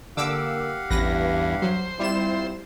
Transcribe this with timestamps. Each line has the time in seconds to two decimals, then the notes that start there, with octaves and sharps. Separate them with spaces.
0.17 D3 A#3 G4 F5 F#5 D6 E6
0.90 A1 E2 G2 B4 A#6
1.62 F#3 C5
1.99 G3 C4 E4 F4 E7